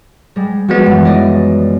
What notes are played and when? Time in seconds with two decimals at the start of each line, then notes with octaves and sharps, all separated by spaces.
0.36 G3 G#3
0.69 F3 G#3 B3 F#4 D5
0.86 F#2 E3
1.04 D#4 D5 D#5